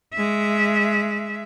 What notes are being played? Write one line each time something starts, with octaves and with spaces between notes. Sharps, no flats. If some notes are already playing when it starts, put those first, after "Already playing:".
G#3 E5